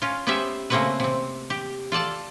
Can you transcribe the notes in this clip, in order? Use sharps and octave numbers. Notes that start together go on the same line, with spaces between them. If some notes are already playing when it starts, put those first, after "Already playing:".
C#4 F4
B3 C#4 G4 B4 C5 E5
C#3 A3 A#3 C4 F#4 B4
C3 C4
G4
F4 A4 D5 A5